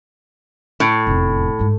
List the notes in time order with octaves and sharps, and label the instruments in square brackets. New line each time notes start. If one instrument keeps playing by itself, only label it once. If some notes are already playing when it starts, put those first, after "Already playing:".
[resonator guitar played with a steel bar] A2
[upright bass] F1 E2
G#2 G#3